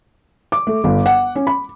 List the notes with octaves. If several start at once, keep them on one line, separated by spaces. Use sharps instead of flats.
D6
A3
G1
F#5
C#4
B5